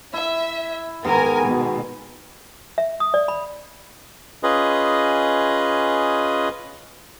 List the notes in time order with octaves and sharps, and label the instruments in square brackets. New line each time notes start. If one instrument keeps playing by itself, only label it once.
[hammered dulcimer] E4 [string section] E5
[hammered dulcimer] G#2 D#3 B3 [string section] A#4 G#5
[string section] B2
[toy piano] E5
D#6
D5
B5
[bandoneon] C#4 F4 G#4 B4 D#5